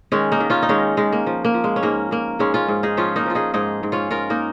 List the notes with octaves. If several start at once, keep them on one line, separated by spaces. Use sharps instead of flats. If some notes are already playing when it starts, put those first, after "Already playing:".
D#3 G#3 C#4
A#3 D#4
D#3
C#4 F4
D#4
D#3 G#3 C#4
D#3 G#3
A#3
F3
A#3
F3
G#3
C#4
G#2 A#3
G#2 A#3
G#2 G#3 C#4
C#4 F4
G#2
D#4 G#4
F3 C#4 F4
A#3 D#4
F3 F4
D#4 G#4
G#2 D#4 G#4
G#2
C#4 F4
G#2 F4 A#4
A#3 D#4